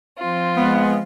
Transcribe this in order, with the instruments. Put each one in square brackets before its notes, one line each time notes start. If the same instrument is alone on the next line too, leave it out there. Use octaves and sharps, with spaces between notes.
[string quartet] F3 C4 F4
[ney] G#3 [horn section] B3